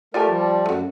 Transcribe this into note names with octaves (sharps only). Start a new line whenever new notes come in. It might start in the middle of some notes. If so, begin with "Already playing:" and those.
A3 F4 G4 A#4 D5 G#5 A5
F3 G3
F#2 A3 F#4